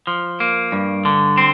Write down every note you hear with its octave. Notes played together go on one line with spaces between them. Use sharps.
F3
A#3
G2
D3
C4